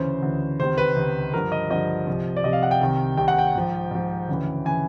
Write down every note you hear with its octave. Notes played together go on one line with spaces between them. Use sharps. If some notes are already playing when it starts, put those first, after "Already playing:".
Already playing: D2 C#3 E3 C5
D2 C#3 E3
C#2 C3 D#3 C5
B4
C#2 C3 D#3
G2 D3 F3 A#4
D#5
G2 D3 F3 D#5
C2 C3 F3
D5
C2 C3 F3 D#5
F5
F#5
G5
C2 C3 D#3
C2 C3 D#3 G5
F#5
G5
G#2 F3
G#2 F3
D2 C#3 E3
C#3 E3 G#5